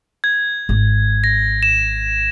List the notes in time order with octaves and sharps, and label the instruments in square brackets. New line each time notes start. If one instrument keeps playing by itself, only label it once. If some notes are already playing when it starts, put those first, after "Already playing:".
[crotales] G#6
[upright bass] G#1
[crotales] A#6
E7